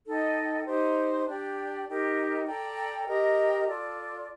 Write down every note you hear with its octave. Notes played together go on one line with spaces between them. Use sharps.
D#4 A4 D#5 G5
D#4 G4 C5
D4 G4 D5 G5
D#4 G4 A#4
A4 D5 G5 A#5
G4 A#4 D#5 A#5
F4 A4 D5